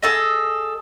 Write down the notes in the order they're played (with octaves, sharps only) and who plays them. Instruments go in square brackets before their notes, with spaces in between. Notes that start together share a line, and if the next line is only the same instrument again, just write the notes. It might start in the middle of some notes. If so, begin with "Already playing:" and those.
[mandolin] G#4 A4 D#5